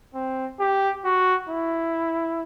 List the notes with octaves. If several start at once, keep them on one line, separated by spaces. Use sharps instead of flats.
C4
G4
F#4
E4